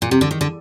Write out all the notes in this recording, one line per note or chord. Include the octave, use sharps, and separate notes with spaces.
A#2
C3
D3
D#3
D3